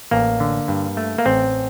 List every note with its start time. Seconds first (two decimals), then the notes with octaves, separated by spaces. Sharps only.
0.11 A1 A#3
0.40 D3
0.68 G2
0.97 A3
1.18 A#3
1.26 A1 C4